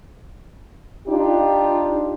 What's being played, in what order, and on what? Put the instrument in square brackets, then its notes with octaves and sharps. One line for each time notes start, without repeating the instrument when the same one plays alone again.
[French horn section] D4 D#4 F4 G4